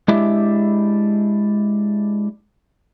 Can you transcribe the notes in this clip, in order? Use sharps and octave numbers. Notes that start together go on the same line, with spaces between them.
G#3 D4 E4 G4 E5